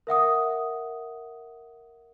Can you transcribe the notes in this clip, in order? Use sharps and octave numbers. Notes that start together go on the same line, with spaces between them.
A#4 E5 F#5 D#6